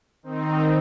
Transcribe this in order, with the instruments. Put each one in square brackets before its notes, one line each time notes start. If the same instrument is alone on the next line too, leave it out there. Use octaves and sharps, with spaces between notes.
[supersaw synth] D#3 C4 D#4